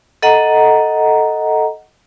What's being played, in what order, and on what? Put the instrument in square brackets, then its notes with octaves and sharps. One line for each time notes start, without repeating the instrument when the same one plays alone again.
[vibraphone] A4 D#5 F#5 A#5